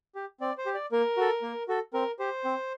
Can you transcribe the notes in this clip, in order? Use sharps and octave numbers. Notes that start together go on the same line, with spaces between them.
G4
C4 D5
C5
G4
D5
A#3 A#4
F#4 A4
A#3
F#4 A4
C4 A#4
G4 C5
C4